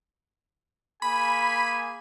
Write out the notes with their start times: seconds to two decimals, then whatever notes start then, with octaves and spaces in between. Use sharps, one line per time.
1.02 A#3 G#4 G#5 B5